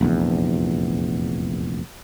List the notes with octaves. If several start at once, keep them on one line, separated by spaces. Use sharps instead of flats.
F1 A#1 E2